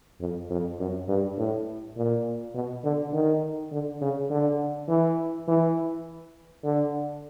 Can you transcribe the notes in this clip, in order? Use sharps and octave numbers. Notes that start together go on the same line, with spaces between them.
F2
F2
F#2
G2
A2
A#2
B2
D3
D#3
D3
C#3
D3
E3
E3
D3